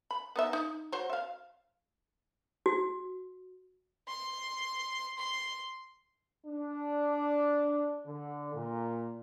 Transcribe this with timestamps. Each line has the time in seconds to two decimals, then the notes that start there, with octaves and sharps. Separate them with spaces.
0.11 B5
0.36 B3 D#4 E5
0.53 D#4
0.92 F#4 C5 C#5
1.10 E5 F5
2.66 F#4
4.08 C6
5.18 C6
6.46 D4
8.07 D3
8.54 A#2